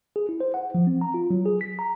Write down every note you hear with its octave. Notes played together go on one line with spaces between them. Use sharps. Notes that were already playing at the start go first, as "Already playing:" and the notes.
G#4
E4
C5
F#5
F3
C4
A#5
F4
F#3
G#4
B6
A#5